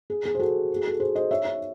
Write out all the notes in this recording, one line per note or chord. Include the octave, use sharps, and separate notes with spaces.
G#4
G#4
C5
F#4 A4
G#4
A4
G#4 C5
C5 D#5
C#5 E5
C#5 E5